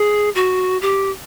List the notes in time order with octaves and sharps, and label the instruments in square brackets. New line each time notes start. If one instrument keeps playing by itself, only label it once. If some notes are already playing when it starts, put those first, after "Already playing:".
Already playing: [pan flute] G#4
F#4
G4